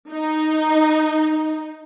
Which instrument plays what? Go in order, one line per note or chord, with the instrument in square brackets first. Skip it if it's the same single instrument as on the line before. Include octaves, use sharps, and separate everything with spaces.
[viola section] D#4